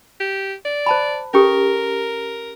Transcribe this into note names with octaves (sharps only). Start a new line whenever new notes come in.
G4
D5
C5 A5 B5
C#4 G4 A4 A#4